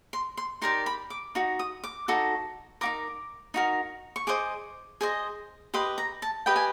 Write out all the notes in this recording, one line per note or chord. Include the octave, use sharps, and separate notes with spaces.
C6
C6
D#4 G4 A#4 D5 C6
B5
D6
D#4 F#4
D#6
D6
D#4 F#4 A4
D#4 F#4 A#4 D6
D#4 F#4 A#4
C#6
G#4 C5 D#5 D6
G#4 C5 D#5
G4 B4 D#5 C6
A#5
A5
G4 B4 D#5 G5
G#5